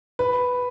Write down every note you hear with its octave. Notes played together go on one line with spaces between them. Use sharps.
B4